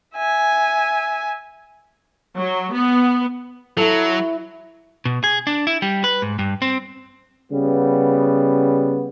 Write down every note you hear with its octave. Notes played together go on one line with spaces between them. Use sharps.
E5 G#5
F#3
B3
F#3 E4 A4
B2
G#4
D4
E4
G3
B4
G#2
G2
C4
C#3 G3 B3